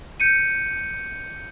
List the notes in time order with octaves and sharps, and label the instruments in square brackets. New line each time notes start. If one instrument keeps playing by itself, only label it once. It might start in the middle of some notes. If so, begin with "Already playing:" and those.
[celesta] G6 C#7 D#7